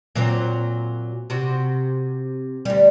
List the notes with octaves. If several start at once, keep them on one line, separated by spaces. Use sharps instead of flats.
A#2 F#3 C4
C3 F#4
D2 G3